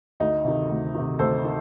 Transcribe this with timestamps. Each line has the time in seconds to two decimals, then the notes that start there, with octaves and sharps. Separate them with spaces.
0.20 D2 D#4
0.45 C3 D#3
0.69 D2
0.95 C3 D#3
1.19 D2 A4 C5
1.44 D#3